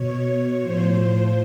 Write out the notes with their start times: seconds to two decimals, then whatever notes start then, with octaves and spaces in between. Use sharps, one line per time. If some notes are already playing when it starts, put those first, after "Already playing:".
Already playing: B2 C#5
0.61 A2 F3 C5